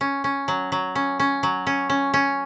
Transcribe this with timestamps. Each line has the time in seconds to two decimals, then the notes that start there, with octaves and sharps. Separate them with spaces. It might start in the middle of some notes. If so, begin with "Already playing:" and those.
0.01 C#4
0.24 C#4
0.48 F#3
0.72 F#3
0.95 C#4
1.19 C#4
1.43 F#3
1.67 C#4
1.89 C#4
2.14 C#4